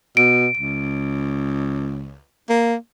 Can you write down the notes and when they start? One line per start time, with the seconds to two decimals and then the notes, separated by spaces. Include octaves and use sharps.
0.17 B2 D7
0.57 C#2
2.49 A#3